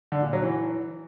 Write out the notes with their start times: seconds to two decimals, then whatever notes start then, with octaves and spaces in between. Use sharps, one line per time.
0.12 D3
0.22 A#2
0.33 F#3
0.43 E3